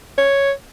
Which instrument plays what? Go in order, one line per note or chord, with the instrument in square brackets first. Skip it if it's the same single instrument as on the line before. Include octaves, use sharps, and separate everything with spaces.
[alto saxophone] C#5